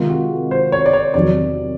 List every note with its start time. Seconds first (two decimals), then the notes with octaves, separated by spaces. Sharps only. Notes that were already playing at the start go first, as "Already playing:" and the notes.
Already playing: C3 D#3 G#3 F4
0.10 F#4
0.51 C5
0.72 C#5
0.86 D5
0.93 C#5
1.14 E2 C3 D#3 F#3 D5